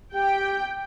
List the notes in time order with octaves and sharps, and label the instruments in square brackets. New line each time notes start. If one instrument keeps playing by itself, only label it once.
[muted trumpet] G4 [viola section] G5